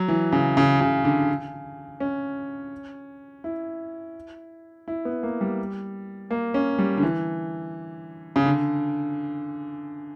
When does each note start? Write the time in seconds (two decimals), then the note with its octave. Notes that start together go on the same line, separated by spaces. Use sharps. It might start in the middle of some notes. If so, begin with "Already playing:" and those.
Already playing: F#3
0.08 E3
0.32 C#3
0.57 C#3
0.80 C#3
1.04 D3
2.00 C#4
3.44 E4
4.88 E4
5.05 B3
5.23 A#3
5.41 G3
6.31 A#3
6.54 C#4
6.78 G3
6.97 D3
7.02 E3
8.36 C#3
8.45 D3